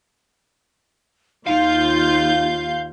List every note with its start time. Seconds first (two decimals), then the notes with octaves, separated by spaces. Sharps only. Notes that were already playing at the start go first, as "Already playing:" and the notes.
1.47 D#2 D#4 F4 F5 G6